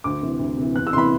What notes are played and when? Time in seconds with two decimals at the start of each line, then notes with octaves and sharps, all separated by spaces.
0.04 D2 D6
0.22 C3 E3
0.39 D2
0.57 C3 E3
0.74 E2 F#6
0.87 E6
0.92 C3 C6
0.96 E3 B5